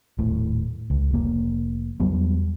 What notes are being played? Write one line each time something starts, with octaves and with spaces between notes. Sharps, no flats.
D#1 A2
C#2
F1 A#3
E2 F#3 G3 B3